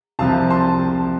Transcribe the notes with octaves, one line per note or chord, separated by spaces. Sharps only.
C2 C3 F3 C4 F5 A5
A5 C6